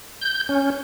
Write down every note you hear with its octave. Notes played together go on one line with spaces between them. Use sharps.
G6
C#4